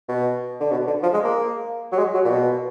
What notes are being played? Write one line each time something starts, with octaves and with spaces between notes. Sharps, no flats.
B2
D3
B2
D3
F3
G#3
A#3
F#3
G#3
F#3
A#2
B2